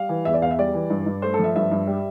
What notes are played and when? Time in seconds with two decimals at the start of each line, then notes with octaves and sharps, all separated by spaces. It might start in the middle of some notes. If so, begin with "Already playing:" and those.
Already playing: G3 F5
0.09 E3
0.25 E2 E5
0.34 D5
0.42 E2 F5
0.51 E5
0.59 G3 D5
0.74 E3
0.90 G2
1.06 G2
1.22 A3 C5
1.34 A4
1.39 F3
1.44 E5
1.56 G2 E5
1.71 G2
1.87 G3